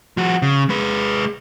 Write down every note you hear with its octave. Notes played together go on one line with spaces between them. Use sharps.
F3 F#4
C#3
G#3 B4